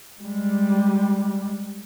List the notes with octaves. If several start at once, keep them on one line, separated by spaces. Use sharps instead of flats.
G3 G#3